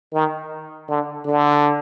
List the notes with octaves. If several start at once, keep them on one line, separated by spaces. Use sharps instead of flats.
D#3
D3
D3